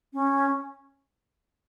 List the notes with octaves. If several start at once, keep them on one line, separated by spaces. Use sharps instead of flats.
C#4